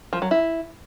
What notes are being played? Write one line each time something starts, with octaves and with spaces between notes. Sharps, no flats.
F3
F#3
E4